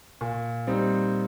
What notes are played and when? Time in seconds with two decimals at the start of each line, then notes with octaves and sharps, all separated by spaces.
0.21 A#2
0.67 G3 C4 D#4